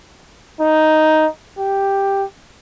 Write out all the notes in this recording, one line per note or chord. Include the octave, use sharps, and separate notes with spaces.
D#4
G4